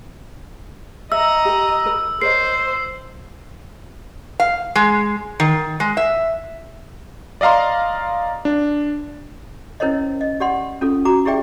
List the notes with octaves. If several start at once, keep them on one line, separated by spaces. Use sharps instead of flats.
D#5 E5 A#5 E6
G4 A#4
A#4 B5
A#4 C5 C#5 D#5 C7
F5
G#3
D#3
G#3
E5
D5 D#5 F5 A#5 C6
D4
C#4 E4 A#4 C5 C#5 D#5
D#5
G4 D5 F#5 C6
C#4 F4 A4
F#4 A#5 D6
E4 G4 G#4 D5 E5 G5